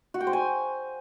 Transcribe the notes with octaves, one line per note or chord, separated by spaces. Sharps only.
F#4
G5
C5
G#5